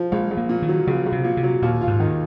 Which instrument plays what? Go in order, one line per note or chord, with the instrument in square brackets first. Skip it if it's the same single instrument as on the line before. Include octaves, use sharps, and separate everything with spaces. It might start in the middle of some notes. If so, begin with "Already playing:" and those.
Already playing: [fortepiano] F3
[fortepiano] A#1 [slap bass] G#3
[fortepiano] A#1
[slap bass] A#3
[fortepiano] A#2
[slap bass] D#3
[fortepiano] F#3
[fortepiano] A#1 [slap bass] C#3
[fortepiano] A#1
[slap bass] C3
[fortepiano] A#2
[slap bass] C3
[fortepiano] F#3
[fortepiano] D#2 [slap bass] A#2
[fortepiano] F4
[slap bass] G#2
[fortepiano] D#3